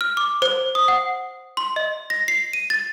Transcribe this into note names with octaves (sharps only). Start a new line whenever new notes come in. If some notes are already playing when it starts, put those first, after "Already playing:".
F6
D6
C5
D#6
F#5
C6
D#5
A#6
C7
D#7
A6